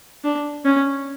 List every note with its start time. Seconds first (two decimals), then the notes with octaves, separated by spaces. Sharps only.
0.24 D4
0.65 C#4